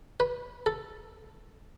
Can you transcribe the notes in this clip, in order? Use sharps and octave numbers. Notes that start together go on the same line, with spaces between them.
B4
A4